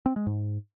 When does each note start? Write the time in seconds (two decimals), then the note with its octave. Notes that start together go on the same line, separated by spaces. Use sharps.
0.06 C4
0.16 G#3
0.27 G#2